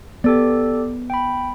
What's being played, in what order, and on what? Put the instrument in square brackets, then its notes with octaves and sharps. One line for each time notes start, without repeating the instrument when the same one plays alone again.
[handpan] B3 [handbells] G4 A4 D5
[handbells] G5 B5